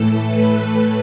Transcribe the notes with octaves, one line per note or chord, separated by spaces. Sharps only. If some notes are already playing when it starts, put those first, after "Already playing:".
Already playing: A2 E3 A3 A4
B4
B4